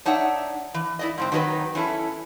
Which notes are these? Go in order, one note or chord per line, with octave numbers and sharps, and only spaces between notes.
D4 D#4 C#5 E5 F#5
E3
E4 D5 D#5
G#2 D3 C4
D#3 F#3 D#4 G#4 B4
E3 C#4 E4 A4